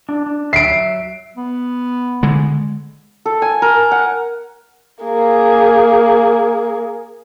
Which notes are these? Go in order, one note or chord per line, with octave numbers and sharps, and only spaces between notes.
D4
D4
F#3 E5 C7 D7
B3
D3 G#3
A4
G#5
A#4
F#5
A#3 G#4